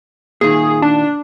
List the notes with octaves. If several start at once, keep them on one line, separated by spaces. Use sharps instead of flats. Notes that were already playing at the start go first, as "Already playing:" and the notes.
A#2 D#3 G#4
D4